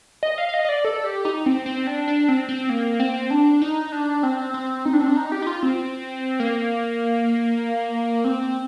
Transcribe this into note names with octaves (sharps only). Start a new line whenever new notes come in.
D#5
F5
F5
D#5
D#5
D5
A4
G4
D#4
C4
C4
D4
D4
C4
C4
A#3
C4
D4
D#4
D4
C4
C4
D#4
D4
C4
D4
D#4
G4
D#4
F4
C4
A#3
C4